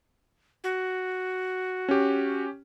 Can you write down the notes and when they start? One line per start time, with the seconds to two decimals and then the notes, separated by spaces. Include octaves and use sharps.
0.64 F#4
1.89 C#4 G4